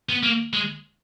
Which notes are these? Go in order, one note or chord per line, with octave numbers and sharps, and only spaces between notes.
B3
A#3
G#3